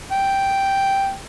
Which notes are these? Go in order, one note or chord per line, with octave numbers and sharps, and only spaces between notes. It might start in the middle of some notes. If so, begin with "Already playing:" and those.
G5